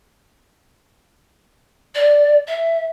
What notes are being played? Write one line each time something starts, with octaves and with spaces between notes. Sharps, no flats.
D5
E5